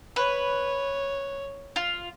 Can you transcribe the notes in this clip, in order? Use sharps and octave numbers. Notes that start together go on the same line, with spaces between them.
B4 C#5
F4